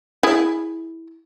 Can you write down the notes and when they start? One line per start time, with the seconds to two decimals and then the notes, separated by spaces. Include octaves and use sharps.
0.23 E4 G#4